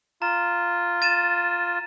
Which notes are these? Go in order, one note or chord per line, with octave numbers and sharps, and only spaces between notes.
F4 A#5
A6 D#7 E7